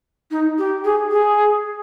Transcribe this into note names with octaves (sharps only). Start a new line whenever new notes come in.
D#4
G4
G#4
G#4